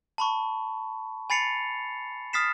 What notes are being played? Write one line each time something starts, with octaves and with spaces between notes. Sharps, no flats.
A5 B5 C#6
G#5 B5 A6 C7 C#7 F7
D#6 F6 A6 B6 C7 E7